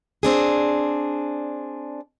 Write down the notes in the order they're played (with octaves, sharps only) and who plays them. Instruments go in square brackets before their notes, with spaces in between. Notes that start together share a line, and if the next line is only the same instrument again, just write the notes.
[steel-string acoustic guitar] C4 D4 G#4